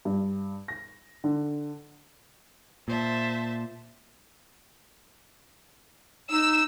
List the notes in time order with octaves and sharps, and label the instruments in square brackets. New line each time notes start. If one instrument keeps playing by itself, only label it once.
[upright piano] G2
A#6
D3
[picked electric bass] A#2 [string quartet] C5 E5 A5
[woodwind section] D#4 [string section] E6